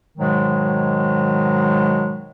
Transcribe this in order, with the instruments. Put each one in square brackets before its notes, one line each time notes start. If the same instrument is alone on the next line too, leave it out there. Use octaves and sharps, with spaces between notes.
[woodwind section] G#2 B2 D#3 F#3 G#3